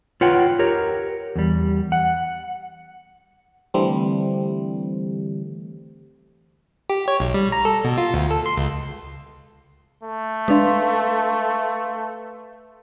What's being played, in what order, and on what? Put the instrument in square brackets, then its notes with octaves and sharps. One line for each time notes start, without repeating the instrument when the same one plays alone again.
[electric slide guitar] F4 B4 C#5 F#5 G5
G4 A#4 C#5
E2 G3
F#5
[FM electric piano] D3 E3 G3 A3 C4
[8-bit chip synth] G4
C#5
B1
G3
A#5
A4
B2
F4
D2
A4
C6
C#2
[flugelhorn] A3
[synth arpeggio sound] G#3 D4 [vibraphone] B4 F5 C6